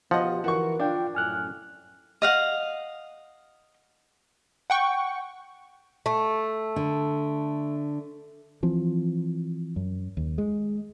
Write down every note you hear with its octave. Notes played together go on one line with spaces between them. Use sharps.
B2 F3 G4 D#5 F#5
E3 F#4 A#4 C#6
D4 F4 F5 G5
F#2 A2 G#5 F6 F#6
D#5 F5 F#5
F#5 G5 C#6
A3
D3
E3 F3 C4
F#2
D#2
G#3